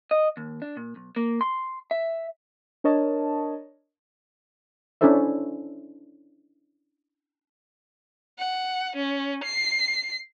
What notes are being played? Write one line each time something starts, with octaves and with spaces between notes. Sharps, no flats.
D#5
D#2
D4
A#2
B1
A#3
C6
E5
D4 A#4 C#5 D#5 A5
C#4 D4 E4 A4 C5 E5
F#5
C#4
C7